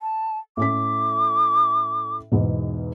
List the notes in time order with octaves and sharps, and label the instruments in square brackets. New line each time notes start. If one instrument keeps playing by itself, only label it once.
[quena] A5
[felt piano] A2 C#4 B6 [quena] D6
[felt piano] E2 G#2 B2